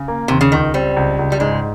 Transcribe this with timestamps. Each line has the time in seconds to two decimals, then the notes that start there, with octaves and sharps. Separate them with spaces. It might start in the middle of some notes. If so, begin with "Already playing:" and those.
Already playing: C#3
0.08 A#3
0.28 D#2 C3
0.41 C#3
0.52 C#2 D#3
0.74 G3 C4
0.96 C#2
1.19 C#2
1.32 G3
1.40 G#2 G#3